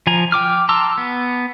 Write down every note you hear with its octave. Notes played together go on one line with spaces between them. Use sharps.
F3 G#5 A#5
G5 D6 F6
A5 A#5 C6 D6 E6
B3